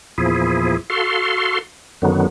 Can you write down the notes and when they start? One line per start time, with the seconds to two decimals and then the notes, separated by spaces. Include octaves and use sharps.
0.18 E2 A#2 F3 E4 G#4
0.90 F#4 A4 F5 C6
2.02 F#2 D3 D#3 F#3 B3